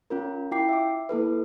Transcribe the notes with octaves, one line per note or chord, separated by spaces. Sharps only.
C#4 F4 A#4
E4 F4 G5 D6 C7
E5 D6
A#3 E4 A4 B4